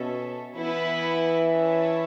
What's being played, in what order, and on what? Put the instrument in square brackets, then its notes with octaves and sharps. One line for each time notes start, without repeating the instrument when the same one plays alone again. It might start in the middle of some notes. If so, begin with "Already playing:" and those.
Already playing: [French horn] B2 [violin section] C#4 A4 E5
[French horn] E3 [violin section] B3 E4 B4
[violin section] C#4 E4 C#5 E5 A5